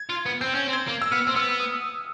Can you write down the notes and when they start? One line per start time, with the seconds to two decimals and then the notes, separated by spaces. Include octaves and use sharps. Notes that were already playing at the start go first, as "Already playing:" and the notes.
Already playing: G#6
0.09 F4
0.26 B3
0.41 C4 G6
0.54 C#4 G6
0.68 C4
0.73 G#6
0.88 A#3
1.02 E6
1.12 B3 F6
1.27 C4 F6
1.36 B3 E6
1.60 D#6